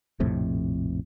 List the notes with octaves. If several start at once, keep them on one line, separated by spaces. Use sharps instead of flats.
A#1 F2 A2 C3